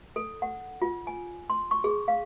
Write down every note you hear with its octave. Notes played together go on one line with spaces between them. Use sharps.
A4
F#5
F4
G#5
C6
C#6
G#4
F5